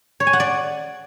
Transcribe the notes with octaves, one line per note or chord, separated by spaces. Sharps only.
C#5
G#5
F#5
D5